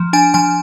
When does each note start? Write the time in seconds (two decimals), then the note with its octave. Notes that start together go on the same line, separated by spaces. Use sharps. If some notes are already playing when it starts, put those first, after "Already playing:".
Already playing: F3
0.13 D4 G#5
0.34 F3 G#5